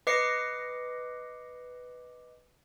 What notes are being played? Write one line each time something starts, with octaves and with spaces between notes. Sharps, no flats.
B4 D#5 D6 A#6 C7 C#7